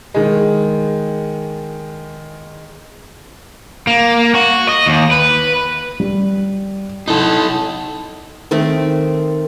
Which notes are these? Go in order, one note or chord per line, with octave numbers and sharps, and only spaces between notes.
D#3 G#3
A#3
F#4
D#5
D#2
B4
G3
D#4 E4 A4
D#3 A3 C4